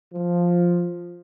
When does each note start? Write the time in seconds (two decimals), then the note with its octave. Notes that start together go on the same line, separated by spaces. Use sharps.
0.14 F3